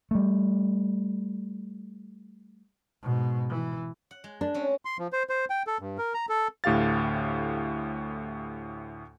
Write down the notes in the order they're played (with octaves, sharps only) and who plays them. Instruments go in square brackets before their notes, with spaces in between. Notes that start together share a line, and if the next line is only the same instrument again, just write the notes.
[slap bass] G3 A3
[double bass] G#2 B2
E3
[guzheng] F#5
G#3
[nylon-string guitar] D4
[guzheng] C4 C#4
[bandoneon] C6
F3
C5
C5
G5
A4
G2
A#4
A#5
A4
[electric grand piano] D2 A2 G4 F5 A6